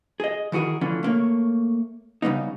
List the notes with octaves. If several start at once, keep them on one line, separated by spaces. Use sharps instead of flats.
G#4 D#5
D#3 E3 F#4 G#4 A#4
D3 E3 F3 A3 C#4 D4
A3 A#3 C#5
C#3 G3 B3 D#4